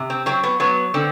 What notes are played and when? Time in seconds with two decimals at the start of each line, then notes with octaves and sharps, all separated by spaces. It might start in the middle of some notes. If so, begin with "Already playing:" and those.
Already playing: C3
0.10 C4
0.26 F#3 C4
0.43 B3
0.60 F#3 B3
0.94 D3 C4